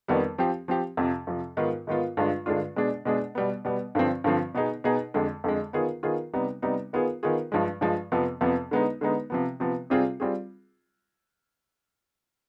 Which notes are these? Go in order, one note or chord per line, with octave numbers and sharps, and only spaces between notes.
F2 D#3 G3 B3
F3 C4 G4
F3 C4 G4
F2 C3 F3
F2 C3 F3
G#2 D#3 B3 F4
G#2 D#3 B3 F4
G2 D3 G#3 D4 F4
G2 D3 G#3 D4 F4
B2 G#3 D4 G#4
B2 G#3 D4 G#4
B2 G3 B3
B2 G3 B3
G2 D3 F3 C4
G2 D3 F3 C4
B2 B3 D#4 G#4
B2 B3 D#4 G#4
F2 D3 G#3
F2 D3 G#3
D#3 B3 F4 G#4
D#3 B3 F4 G#4
C3 G3 B3 D#4
C3 G3 B3 D#4
D#3 B3 F4 G#4
D#3 B3 F4 G#4
G2 F3 G#3
G2 F3 G#3
F2 C3 F3 B3
F2 C3 F3 B3
D3 G#3 B3 D#4
D3 G#3 B3 D#4
C3 F3 B3
C3 F3 B3
C3 G3 C4 F4 G#4
G3 C4 F4 G#4